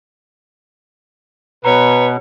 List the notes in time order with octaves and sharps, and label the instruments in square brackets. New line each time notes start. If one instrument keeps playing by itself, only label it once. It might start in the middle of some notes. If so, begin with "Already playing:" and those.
[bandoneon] B2 [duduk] B4 [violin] C#5 [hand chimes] A#5